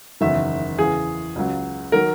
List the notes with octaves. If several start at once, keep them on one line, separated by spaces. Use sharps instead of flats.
F#1 E2 D#3 F#3 E5
E2 C#3 E3 G#4
C#2 C#3 F#3
D#3 F#3 A#4